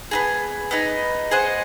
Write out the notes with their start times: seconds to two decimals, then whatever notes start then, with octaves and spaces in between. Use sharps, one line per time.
0.11 B3 D#4 G#4
0.71 B3 D#4 G#4
1.31 G#4 C5 D#5 F#5